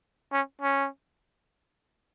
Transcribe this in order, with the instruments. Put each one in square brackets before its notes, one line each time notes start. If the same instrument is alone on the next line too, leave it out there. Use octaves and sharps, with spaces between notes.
[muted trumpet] C#4
C#4